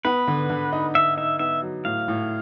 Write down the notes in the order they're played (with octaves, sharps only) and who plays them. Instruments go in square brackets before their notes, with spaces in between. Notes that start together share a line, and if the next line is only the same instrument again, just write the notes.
[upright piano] B3 [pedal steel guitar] B4
[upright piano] D3
D3
D#4
[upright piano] D#4 [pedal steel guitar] E5
[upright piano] D#4 [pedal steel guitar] E5
[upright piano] B3 [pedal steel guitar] E5
[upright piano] F#3
[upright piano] A2 [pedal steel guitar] F5
[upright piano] A2